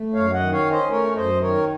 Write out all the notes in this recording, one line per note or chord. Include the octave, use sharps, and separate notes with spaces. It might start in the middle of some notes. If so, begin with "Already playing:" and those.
Already playing: A3
F#2 C#5 F5
D#5 F#5
D#3
C#5 F5
C#4
C5 D#5
A3 A#4 C#5
F#2 C5 D#5
D#3 A#4 C#5